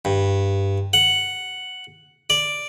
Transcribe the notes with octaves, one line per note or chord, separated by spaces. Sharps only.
G2
F#5
D5